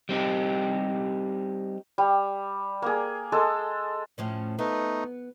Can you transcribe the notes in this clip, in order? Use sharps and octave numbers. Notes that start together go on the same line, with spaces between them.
G3 C4 D#4 G4
G3
A#3 G#4
G#3 A4 A5 D#6
A2 F3 C#4
A3 B3 D#4